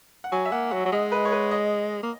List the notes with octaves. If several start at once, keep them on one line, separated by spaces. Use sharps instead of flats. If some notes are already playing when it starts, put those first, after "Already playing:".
F#5
F#3 G#5
E5
A#3 F#5
F#3 F#5
F#3
G#3 D#5
B4
C#5
B4
D#5
A#3